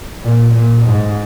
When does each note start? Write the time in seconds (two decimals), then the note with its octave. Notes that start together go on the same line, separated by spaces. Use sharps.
0.23 A#2
0.54 A#2
0.84 G#2